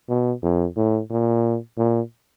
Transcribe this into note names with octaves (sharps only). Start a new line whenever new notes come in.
B2
F2
A2
A#2
A#2